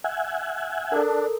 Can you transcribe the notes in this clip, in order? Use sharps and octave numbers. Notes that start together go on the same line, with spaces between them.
E5 F#5 G#5
D4 A4 A#4